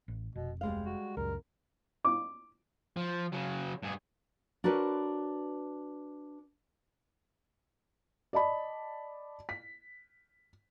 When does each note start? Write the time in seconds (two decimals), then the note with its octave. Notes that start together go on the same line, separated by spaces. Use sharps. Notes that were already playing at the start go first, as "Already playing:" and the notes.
0.08 A1
0.36 F1 B2
0.61 D2 G3 G#3 F5
0.86 F#4
1.17 C#2 F#2 A#4
2.05 D6
2.96 F3
3.32 C#3 F#3
3.83 G2 G#4
4.64 D4 F#4 A#4 B4 C#5
8.33 D5 D#5 A5 B5
9.49 B6